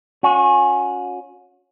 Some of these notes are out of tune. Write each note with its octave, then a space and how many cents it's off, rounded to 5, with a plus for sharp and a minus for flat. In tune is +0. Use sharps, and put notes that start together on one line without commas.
C#4 +5 F#4 -35